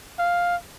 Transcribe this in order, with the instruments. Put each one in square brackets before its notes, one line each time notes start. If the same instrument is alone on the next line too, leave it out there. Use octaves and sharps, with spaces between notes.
[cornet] F5